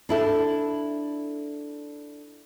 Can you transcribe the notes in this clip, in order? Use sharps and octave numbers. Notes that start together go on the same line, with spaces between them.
D4 E4 A4